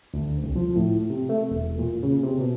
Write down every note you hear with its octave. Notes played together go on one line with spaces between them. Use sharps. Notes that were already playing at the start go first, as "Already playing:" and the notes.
D2
C2
F3
A2
C3
A3
E1
A#2
C#3
C3
B2